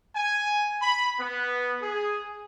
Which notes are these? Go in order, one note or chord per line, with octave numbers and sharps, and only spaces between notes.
G#5
B5
B3
G#4